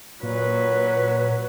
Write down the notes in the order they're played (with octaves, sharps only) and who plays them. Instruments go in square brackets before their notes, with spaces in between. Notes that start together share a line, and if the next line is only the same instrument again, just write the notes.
[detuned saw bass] A#2 [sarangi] F#3 [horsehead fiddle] B4 [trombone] C#5